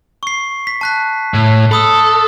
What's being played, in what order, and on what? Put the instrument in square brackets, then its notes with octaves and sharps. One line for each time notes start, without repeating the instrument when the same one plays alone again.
[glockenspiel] C#6 C7
B6
A5 F#6 B6
[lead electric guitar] A2
[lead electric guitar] A4 [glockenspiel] B5 D#6 E6